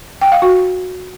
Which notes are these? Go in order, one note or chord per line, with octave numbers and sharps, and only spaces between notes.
G5
F5
F#4